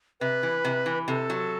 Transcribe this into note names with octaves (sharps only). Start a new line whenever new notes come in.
C3 B4
E3
C3
E3
C3 A4
F#3